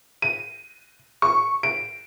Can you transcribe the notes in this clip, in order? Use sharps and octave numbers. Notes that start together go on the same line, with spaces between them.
D#7
C#6
D7